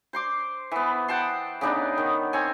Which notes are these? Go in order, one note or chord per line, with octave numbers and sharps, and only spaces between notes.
C5 C6 D6
E3 B3
F#5 G5 A5 C6
C#3 B3 D4 D#4
D#3
C4 C#5 G#5